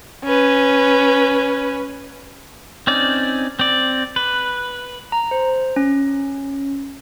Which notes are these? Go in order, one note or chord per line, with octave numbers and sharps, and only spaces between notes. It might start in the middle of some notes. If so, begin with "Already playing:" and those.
C#4 B4
C4 C#4 D#4 D5
C4 D5
B4
A#5
C5
C#4